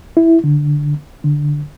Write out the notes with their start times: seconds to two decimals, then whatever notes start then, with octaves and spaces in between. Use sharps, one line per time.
0.17 E4
0.44 D3
1.24 D3